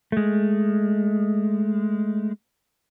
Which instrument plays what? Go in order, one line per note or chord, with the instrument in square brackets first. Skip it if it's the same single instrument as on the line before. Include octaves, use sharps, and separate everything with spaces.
[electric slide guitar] G#3 A3